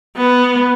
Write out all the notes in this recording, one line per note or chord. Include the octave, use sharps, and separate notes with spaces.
B3